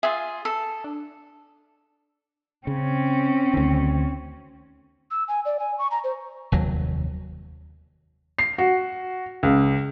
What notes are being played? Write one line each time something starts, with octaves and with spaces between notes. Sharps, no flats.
F4 G#4 E5
A4
D4
C#3 C4 C#4
D2 D#3
E6
G#5
D5
G#5
C#6
A#5
C5
F1 D#2 F#3
C7
F#4
C#2